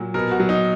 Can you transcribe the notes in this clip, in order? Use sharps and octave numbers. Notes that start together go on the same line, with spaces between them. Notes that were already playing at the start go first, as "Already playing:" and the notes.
Already playing: A#2 F#3
B2 A#4
F#4
F#3
D#4